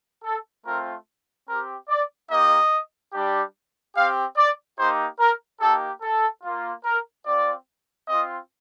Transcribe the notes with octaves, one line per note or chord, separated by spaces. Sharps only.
A4
A3 C4 F4 A#4
C4 G4 A#4
D5
A#3 D#4 G4 D#5
G3 D4 G4
C4 G4 F5
D5
A#3 D#4 G4 C5
A#4
A#3 D#4 G4 A4
A4
A#3 F4
A#4
C4 F4 D5
C4 F4 D#5